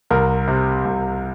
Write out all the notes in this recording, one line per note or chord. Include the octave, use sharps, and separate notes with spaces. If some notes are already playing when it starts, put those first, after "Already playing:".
C2 A#4
C3
C2